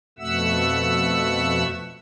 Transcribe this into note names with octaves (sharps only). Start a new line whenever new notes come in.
F2 B2 A3 E5 F#5 E6